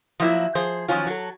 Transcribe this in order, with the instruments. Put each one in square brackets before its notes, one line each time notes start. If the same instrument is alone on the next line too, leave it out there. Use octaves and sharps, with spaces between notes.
[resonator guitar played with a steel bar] F3 F#3 A#3 E4 E5
F3 G#4 C5
D#3 F3 F#3 C#4 F4
F#3 A4